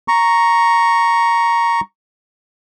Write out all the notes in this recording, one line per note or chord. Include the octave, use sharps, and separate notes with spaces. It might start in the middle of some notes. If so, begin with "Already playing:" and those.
A#5 C#6